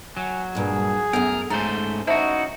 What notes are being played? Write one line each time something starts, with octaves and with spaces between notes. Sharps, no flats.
F#3 G#5
G2 A#2 G#4
F#2 A3 B3 A#4
G#2 A3 C#4 C5 A#5
D#4 E4 F#4 C5 E5 A5